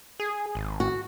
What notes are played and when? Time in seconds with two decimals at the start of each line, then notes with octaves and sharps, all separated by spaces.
0.20 G#4
0.55 G#1
0.80 F#4